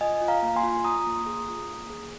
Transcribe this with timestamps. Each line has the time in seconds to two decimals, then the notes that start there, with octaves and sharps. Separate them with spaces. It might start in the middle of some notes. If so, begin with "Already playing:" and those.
0.01 F4 D#5 G#5
0.21 F4
0.28 F5 A#5
0.43 A#3
0.56 G#5 C6
0.63 F4
0.84 F4 A#5 D#6
1.06 A#3
1.26 G#4
1.48 F4
1.69 A#3
1.90 G#4